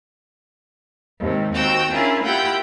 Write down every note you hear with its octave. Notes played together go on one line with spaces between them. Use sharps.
D#2 G#2 C3
D#2 C4 F#4 G5 A#5 E6
C#4 D4 E4 F4 G#4 A#4
A#3 E4 F4 G4 F#5 G5